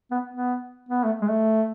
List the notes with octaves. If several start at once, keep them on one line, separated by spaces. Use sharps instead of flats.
B3
B3
B3
A3
G#3
A3